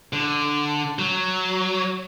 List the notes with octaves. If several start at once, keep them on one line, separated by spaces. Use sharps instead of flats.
D3
F#3